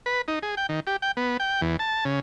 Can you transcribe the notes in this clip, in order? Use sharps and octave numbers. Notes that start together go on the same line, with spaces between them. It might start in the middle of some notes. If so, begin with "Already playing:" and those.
B4
D#4
G#4
G5
D#3
G4
G5
B3
G5
E2
A5
C#3